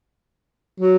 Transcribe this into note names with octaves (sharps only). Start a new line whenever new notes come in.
F#3